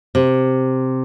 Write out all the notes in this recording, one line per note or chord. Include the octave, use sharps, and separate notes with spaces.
C3